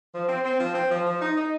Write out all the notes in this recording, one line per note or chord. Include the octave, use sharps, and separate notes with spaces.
F3
C4
C4
F3
C4
F3
F3
D#4
D#4